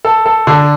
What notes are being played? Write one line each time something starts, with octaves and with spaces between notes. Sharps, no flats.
A4
A4
D3